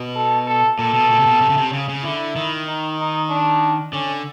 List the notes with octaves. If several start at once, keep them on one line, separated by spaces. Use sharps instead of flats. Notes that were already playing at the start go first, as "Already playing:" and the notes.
Already playing: B2
A4
A4
A#2 A4
B2
A#2
C3
B2
C3
C#3
C3
C#3
C#3
D3 E4
D#3
D#4
D#4
D4
D3 C#4